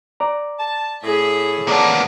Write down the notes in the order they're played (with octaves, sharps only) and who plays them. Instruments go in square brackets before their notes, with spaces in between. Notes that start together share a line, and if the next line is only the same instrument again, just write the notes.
[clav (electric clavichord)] D5 A#5
[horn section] A5
[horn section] A2 [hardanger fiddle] G#4 E5
[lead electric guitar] A#3 B3 [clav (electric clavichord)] C#5 D5 A5